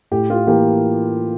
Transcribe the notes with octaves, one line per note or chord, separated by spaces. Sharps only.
A2 G4
F4
E3 A#3 G4